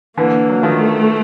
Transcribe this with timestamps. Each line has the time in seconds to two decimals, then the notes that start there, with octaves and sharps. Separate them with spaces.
0.18 D3 E3 A#3
0.49 F#3
0.63 D#3 F3 A3